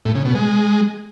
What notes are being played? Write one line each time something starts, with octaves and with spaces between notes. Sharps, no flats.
A2
C#3
B2
G#3